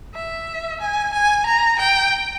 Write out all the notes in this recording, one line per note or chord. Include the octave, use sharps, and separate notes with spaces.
E5
G#5
G#5
A#5
G5